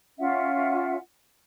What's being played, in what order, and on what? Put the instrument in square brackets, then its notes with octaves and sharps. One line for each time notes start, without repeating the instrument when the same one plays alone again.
[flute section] C#4 F4 E5 F#5